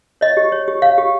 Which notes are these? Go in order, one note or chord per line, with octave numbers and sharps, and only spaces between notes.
C#5 D#5
G4
C#5
G4
C#5 F5
G4